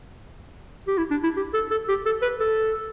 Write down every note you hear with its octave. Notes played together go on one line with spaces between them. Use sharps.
G4
E4
D4
E4
G4
A4
A4
G4
A4
B4
A4